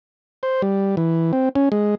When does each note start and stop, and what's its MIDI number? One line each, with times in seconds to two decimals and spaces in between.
0.43 0.62 72
0.62 0.96 55
0.97 1.32 52
1.33 1.49 60
1.55 1.69 61
1.72 1.95 56